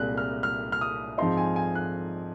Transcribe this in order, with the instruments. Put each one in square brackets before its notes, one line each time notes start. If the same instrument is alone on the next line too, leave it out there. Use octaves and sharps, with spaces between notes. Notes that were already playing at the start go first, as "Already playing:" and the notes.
Already playing: [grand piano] C2 A#2 G#3 F#6
F6
F6
F6
D#6
G#2 F3 C4 D#4 C6
G#5
G#5
F#6